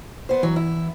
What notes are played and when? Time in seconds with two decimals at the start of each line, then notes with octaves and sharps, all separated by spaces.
0.29 B3 C5
0.43 E3 F#3
0.56 E4